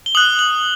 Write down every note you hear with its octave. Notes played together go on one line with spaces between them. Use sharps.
G7
D#6 F#6 F#7
F#7